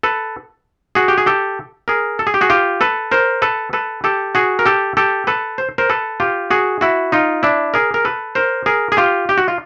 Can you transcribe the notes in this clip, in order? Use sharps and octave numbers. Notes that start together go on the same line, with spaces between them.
A4 B4
F#4 G#4
G4
G#4
G4 A4
G#4 A#4
A4
G#4
G4
F#4 G#4
F4 G4
A4 B4
A#4 C5
A4 B4
A4 B4
G4 A4
F#4 G#4
A#4
G4 A4
G4 A4
A4 B4
C5
A#4 C5
A4 B4
F4 G4
F#4 G#4
E4 F#4
D#4 F4
D4 E4
G#4 A#4
A#4
A4 B4
A#4 C5
G#4 A#4
G#4
F4 G4
G4
F#4
F4